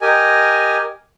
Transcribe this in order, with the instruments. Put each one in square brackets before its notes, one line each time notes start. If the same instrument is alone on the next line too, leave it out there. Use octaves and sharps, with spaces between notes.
[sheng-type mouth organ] G4 A#4 D#5 G#5